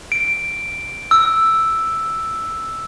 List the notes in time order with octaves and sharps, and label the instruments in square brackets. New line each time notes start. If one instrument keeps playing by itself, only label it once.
[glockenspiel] D7
E6